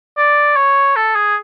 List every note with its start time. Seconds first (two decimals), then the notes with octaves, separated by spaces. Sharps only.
0.17 D5
0.56 C#5
0.96 A4
1.15 G#4